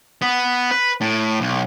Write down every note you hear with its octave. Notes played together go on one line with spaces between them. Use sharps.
B3
B4
A2
B1